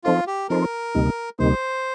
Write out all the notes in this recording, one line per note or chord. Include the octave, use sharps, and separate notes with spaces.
F3 C4 D#4 F4 A4 C5
G4
F3 C4 D#4 A4 A#4 C5
D2 C3 G3 A#3 D#4
D2 C3 G3 A#3 D#4 C5